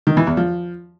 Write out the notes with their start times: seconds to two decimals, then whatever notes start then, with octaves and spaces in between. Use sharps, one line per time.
0.07 D#3
0.17 E3
0.27 E2
0.37 F3